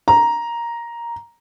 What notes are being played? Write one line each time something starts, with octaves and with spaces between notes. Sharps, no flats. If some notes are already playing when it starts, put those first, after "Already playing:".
A#5